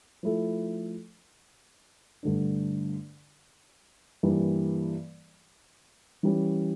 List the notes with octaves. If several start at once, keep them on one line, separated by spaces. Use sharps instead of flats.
F3 A3 E4 A4
G2 D3 A3 D4
G2 E3 G3 A#3
E3 G3 C#4